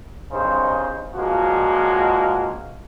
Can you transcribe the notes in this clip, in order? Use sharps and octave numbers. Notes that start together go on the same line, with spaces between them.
C2 G2 C#3 D#4 C5
C#2 G2 F3 G#3 A#3 F#4